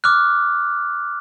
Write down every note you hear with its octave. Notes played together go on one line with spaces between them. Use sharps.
D6 F6 F#6